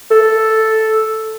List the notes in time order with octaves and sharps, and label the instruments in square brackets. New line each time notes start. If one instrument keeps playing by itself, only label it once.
[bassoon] A4